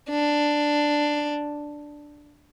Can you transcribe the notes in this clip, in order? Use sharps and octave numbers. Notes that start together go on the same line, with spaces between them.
D4